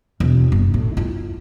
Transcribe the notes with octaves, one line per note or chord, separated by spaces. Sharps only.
E1
F#1
A2
E4 F4